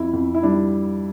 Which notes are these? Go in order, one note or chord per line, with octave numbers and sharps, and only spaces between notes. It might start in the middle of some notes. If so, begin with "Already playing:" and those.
Already playing: F2 E4
F2
E4
G3 D4